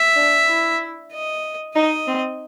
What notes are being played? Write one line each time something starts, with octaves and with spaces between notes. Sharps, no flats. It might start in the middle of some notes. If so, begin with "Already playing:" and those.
Already playing: E5
D4
E4
D#5
D#4 D#5
C4